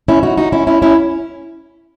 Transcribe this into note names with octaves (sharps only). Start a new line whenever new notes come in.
C#4 E4
D#4 F#4
D#4 F#4
C#4 E4
C#4 E4
C#4 E4